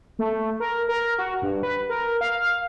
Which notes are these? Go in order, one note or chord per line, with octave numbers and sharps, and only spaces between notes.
A3
A#4
A#4
F#4
G2
B4
A#4
F5